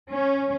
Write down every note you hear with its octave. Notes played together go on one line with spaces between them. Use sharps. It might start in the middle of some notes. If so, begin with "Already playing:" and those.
C#4